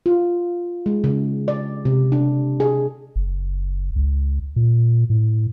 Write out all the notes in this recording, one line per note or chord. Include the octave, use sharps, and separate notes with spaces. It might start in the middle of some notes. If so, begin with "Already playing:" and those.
F4
G#3
C#3
D5
C3
D4
G#4
F#1
C#2
A#2
A2